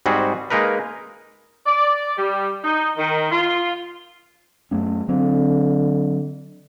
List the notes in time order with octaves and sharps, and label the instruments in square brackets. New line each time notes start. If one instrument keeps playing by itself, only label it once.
[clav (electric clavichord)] G#2 G3 C4 F#4 G#4
G#3 A#3 D#4 A#4 B4
[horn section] D5
G3
D#4
D#3
F4
[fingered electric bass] F#2 A3 C#4
[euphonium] D3 [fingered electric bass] F#3 C4